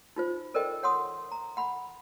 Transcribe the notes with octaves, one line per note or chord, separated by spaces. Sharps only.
D#4 F4 C5
A4 A#4 C5 D5 D#5 G5
C#5 F#5 C6 D#6
A#5
F#5 B5